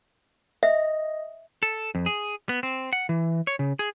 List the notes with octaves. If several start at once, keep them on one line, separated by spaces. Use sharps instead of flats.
D#5 E5
A4
F2
G#4
B3
C4
F#5
E3
C#5
C#3
G#4